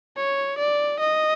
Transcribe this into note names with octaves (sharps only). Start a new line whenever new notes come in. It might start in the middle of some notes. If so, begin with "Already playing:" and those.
C#5
D5
D#5